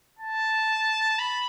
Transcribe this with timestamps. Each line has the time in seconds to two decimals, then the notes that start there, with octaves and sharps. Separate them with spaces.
0.19 A5
1.19 B5